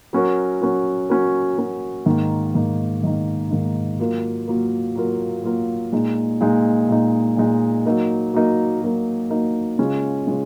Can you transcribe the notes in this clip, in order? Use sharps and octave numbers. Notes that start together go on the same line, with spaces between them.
F#3 C#4 F#4 A#4
F#3 C#4 F#4 A#4
F#3 C#4 F#4 A#4
F#3 C#4 F#4 A#4
G#2 D#3 A#3 D#4
G#2 D#3 A#3 D#4
G#2 D#3 A#3 D#4
G#2 D#3 A#3 D#4
F#3 A#3 F4 A#4
F#3 A#3 F4 A#4
F#3 A#3 F4 A#4
F#3 A#3 F4 A#4
A#2 G#3 D#4
A#2 G#3 D#4
A#2 G#3 D#4
A#2 G#3 D#4
F#3 A#3 D#4 A#4
F#3 A#3 D#4 A#4
F#3 A#3 D#4 A#4
F#3 A#3 D#4 A#4
C#3 G#3 C#4 F4
C#3 G#3 C#4 F4